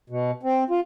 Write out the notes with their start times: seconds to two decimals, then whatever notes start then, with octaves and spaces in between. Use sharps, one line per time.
0.10 B2
0.43 C4
0.70 F4